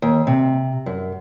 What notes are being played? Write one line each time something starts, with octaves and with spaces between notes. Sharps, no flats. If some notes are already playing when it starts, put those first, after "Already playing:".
D#2
C3
F#2